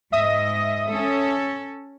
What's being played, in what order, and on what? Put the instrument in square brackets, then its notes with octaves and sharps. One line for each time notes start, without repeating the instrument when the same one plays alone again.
[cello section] G#2 D#5 [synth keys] E5 D#6
[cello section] C#4 A4